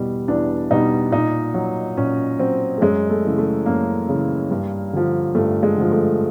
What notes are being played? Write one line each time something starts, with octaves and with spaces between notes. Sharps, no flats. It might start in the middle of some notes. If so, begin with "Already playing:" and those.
Already playing: E2 B2 G3 B3
E2 D4
B2 G3 D#4
A#2 D#4
F#3
A#2 C#4
F#3 C4
A3
F#2 G#3
A3
C#3 E3
A3
F#2 A#3
C#3 E3
G2
D3 F3
G2 A3
G#3
D3 F3
A3